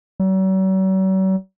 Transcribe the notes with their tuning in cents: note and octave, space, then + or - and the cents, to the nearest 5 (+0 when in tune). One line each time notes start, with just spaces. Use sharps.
F#3 +45